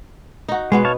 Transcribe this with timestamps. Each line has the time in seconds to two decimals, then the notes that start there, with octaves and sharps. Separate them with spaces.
0.48 D#4 F#4
0.72 B2 G#3 B3 C#4
0.85 C#5 F5 A5